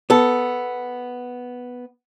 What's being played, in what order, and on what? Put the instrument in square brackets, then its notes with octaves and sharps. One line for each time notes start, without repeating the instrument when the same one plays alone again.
[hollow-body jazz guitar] B3 A4